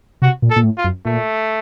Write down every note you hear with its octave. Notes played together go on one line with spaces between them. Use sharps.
C3 F#4
A#2
A4
A#2
A2
F4
F#2
A#2 A3